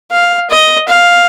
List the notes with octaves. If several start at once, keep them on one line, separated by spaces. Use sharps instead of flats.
F5
D#5
F5